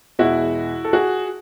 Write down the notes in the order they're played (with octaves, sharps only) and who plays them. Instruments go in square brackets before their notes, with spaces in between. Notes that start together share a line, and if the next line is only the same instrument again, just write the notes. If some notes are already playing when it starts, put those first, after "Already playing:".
[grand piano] E2 B2 G#3 E4 F#4
A4
F#4 G#4